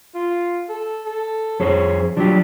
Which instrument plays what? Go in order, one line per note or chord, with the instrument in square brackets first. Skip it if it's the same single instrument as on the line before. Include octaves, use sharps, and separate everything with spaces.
[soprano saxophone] F4
A4
A4
[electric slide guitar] F2 G#4 C5 [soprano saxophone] C#5
[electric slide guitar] F3 F#3 G4 [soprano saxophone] D4